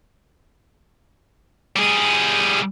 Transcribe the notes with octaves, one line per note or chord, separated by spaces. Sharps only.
G3 G#4